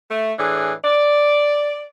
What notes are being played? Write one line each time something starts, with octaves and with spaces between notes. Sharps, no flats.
A3
A2 E3 D4 G#4
D5